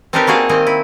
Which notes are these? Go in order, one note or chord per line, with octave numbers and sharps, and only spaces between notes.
C4 D4 D#4 G4 A#4 B4
G3 A#3 F#4 G#4 F5
D#3 G3 C4 D#5 G#5
E4